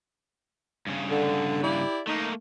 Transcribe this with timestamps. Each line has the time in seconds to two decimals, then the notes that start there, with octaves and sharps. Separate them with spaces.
0.87 G2 C#3
1.10 D3
1.62 E4 G4 D5
2.07 A3 A#3 D#4